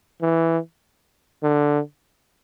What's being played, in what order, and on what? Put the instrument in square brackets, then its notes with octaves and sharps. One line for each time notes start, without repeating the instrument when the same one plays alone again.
[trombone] E3
D3